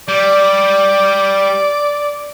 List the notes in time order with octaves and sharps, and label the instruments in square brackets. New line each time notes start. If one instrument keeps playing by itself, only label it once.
[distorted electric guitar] G3 [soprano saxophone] D5